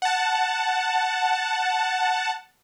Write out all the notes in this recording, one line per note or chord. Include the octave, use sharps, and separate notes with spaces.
F#5 A5